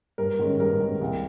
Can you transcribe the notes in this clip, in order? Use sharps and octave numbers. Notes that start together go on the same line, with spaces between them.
G2 A#4
D#3 G#3 C#4
G2 A#4
D#3 G#3 C#4
C2